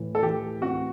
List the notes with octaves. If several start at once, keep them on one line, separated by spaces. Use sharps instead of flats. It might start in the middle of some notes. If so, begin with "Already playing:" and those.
Already playing: A2 E3
A4
E3 G4
C4 F#4